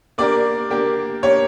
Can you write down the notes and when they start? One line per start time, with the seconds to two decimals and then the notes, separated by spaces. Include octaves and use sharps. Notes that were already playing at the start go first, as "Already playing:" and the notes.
0.18 A#3 D4 G4 A#4 D5
0.70 A#3 D4 G4 A#4
1.23 A#3 D4 G4 A#4 C#5